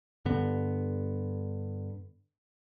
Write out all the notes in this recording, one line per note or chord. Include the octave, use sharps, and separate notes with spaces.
G2 D3 B3